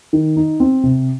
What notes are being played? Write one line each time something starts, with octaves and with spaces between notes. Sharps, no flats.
D#3
D#4
C4
C3